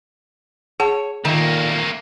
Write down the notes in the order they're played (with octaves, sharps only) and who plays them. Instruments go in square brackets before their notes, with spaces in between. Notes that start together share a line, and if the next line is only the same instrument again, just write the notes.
[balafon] G#4 F#5 A5 [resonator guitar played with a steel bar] C#5
[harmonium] A#2 [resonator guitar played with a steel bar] D#3 [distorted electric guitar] A3 A#3